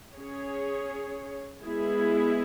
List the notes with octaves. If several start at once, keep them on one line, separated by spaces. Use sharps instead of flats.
C#4 G#4 C#5
G#3 B3 E4 G#4